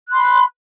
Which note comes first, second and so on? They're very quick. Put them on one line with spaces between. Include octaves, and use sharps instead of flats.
F#6 C6 B5